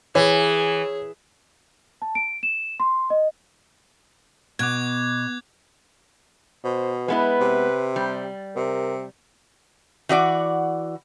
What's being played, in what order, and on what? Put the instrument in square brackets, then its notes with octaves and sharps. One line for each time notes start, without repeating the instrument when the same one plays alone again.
[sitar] E3 [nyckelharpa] G#4 [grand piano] C#5
[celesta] A5
D7
E7
C6
D#5
[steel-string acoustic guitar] B2 [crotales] D6 F#6 G#6
[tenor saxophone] B2 [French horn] C5
[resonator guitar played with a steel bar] G#3 B3 E4 [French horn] B4
[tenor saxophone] C3
[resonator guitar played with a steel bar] G3
[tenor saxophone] C3 [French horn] A#4
[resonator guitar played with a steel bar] E3 F#4 D5 F#5